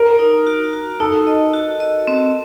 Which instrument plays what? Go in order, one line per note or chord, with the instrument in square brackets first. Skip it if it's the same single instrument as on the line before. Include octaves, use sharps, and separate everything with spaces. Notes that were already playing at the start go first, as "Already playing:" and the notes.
Already playing: [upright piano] A#4
[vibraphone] D#4
F#4
F#4
[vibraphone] D#4 [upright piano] A4
[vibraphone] D#5
F#4
D#5
C4